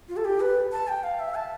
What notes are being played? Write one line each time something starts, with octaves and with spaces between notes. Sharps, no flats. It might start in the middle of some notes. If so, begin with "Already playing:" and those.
F4
A4
G4
B4
A5
G5
F5
E5
A5